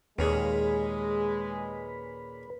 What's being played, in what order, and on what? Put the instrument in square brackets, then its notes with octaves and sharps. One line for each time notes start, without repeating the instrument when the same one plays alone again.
[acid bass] D#2 [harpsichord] A#2 C#4 G#4 [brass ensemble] G#3 [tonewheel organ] B4